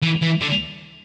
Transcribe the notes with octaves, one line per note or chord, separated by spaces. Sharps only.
E3
E3
D3